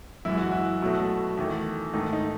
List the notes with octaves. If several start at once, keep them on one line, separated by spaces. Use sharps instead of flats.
F#2 E3 G#3 E4
F#4
E4
B2 F#3 A3
E2 D#3 A3
G#2 D#3 A3 D#4
D#4